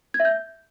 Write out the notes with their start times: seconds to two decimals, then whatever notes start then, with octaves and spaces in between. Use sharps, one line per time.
0.14 G#6
0.20 E5
0.25 G6